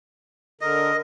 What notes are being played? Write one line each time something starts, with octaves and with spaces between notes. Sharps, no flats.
D3 A#4 D#5